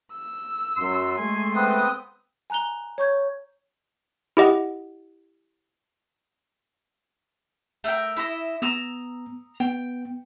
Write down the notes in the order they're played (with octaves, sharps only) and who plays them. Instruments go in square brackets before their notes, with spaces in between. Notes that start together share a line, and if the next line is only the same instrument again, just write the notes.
[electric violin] E6
[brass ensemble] F#2 [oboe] C6
[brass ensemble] G#3 A3 [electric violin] G#5
[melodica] B3 C4 B4 [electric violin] G5 D#6
[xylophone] G#5 A#5 F#6 F7 G7
C#5 C#6 G6 G#6
[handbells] E4 G4 D#5 F#5
[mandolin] A3 A#4 G5
E4 D#5
[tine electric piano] B3 [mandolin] A#5 D#6 E6
[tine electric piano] B3 [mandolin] G5